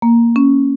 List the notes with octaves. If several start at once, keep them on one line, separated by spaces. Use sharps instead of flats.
A#3
C#4